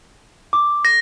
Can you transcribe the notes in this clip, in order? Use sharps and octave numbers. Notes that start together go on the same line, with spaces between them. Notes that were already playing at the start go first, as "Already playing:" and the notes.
D6
A#6